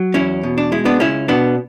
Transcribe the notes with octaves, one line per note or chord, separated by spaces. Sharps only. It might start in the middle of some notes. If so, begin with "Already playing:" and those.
Already playing: F#3
E2 C#4 E4
B2
D4
G#3 E4
B3 D4
C#2 C#4 E4
B2 B3 D4